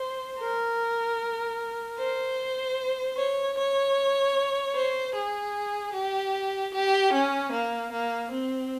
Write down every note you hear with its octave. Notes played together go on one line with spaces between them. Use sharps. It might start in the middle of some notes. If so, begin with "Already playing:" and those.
Already playing: C5
A#4
C5
C#5
C#5
C5
G#4
G4
G4
C#4
A#3
A#3
C4